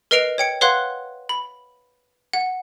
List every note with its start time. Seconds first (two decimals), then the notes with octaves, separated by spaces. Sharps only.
0.11 A#4 B4 D#5 C7 D7 F7
0.38 C#5 G5 C#7
0.61 B4 C#5 F5 F#5 C6 F#6
1.29 B5
2.33 F#5